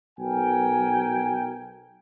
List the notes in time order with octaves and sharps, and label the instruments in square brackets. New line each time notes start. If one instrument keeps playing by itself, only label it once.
[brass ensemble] B1 A#4 G5 G#5